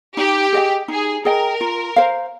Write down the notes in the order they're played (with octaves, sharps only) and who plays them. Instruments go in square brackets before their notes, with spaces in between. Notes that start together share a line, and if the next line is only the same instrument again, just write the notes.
[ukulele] D#4 [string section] G4
[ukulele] G#4 D#5 G5
[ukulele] D#4 [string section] G#4
[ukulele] G#4 D#5 G5 [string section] A#4
[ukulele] F4
C5 F5